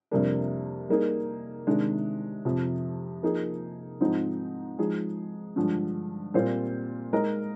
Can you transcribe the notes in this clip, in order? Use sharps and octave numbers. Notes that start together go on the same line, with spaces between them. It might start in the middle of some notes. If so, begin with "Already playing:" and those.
F2 C3 G3 A#3 D4
G3 A#3 D#4 G#4
C3 D#3 G#3 D4
F2 C3 F3
F3 A#3 D#4 G#4
G#2 F3 G#3 C4 D#4
F3 G#3 D#4 G#4
G2 D3 F3 G#3
A#2 G3 C4 F4 C5
G#3 D#4 A#4 D#5